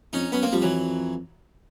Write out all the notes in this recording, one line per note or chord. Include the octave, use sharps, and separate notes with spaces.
F2 C#4 D#4
F#2 B3 C#4
A#3 C4
F2 F3 G3
E3 F#3